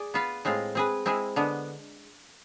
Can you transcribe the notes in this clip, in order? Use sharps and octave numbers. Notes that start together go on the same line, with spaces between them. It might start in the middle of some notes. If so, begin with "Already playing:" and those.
Already playing: G#4 D5
B3 F4 B4 F5
A2 G#3 C4 F4
C4 G#4 B4
G#3 C4 E4 G#4
D3 G#3 B3